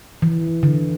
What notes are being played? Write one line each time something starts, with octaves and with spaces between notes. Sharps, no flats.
E3
D3